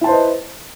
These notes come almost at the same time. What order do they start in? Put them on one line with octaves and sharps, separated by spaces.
E4 A5 C5 B4 D#5